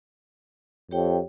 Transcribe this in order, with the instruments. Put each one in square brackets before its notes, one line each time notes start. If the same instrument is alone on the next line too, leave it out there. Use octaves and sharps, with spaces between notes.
[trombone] F2 [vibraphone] G4 C#5 G5